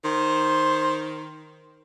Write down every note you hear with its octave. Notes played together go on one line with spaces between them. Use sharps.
D#3 C5